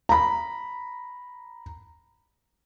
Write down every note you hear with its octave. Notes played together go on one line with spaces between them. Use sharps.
A#5 B5